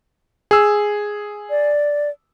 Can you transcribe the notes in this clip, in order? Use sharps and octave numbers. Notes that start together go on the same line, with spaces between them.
G#4 E6
D5